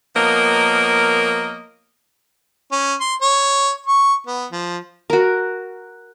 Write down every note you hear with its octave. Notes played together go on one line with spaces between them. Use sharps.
F3 A#3 B3 A#4 C#5 D#5
C#4
C6
C#5
C#6
B3
F3
F#4 A#4